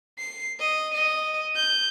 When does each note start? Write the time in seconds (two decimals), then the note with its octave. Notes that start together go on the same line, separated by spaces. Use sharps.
0.18 C7
0.60 D#5
0.94 D#5
1.56 G6